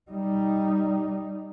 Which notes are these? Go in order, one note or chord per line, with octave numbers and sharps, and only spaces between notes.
G3 D#4